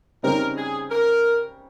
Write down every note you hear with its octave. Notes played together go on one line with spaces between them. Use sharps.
C#3 G3 C4 D#4 A#4
G#4
A#4